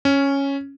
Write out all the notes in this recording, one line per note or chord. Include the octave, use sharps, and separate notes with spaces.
C#4